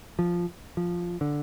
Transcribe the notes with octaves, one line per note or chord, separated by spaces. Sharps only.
F3
F3
D3